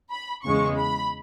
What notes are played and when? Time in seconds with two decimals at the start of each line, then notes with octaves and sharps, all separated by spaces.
0.10 B5
0.44 E2 C#3 G#3 C#6
0.78 B5